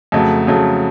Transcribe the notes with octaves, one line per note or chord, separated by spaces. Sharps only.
F2 C#3 F#3 A3
F2 C#3 F#3 A3